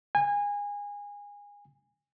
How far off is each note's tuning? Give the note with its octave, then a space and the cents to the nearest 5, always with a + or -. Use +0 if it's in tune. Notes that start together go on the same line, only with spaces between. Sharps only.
G#5 -25